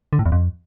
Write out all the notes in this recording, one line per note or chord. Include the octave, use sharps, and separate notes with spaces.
D3
A2
E2
F2